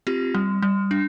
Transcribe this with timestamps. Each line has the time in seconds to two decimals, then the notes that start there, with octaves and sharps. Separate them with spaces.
0.07 C4 F4 G4
0.34 G3
0.62 G3
0.91 D4